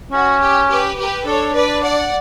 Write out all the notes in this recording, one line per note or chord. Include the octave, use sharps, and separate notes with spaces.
C#4 F#4
G4
G4 B4
G4 B4
D4 A4 C#5
B4 D5
D5 F#5